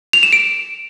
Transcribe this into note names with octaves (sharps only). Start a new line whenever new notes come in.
F7
E7
D7